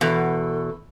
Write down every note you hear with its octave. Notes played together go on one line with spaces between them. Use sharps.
E2 B2 A4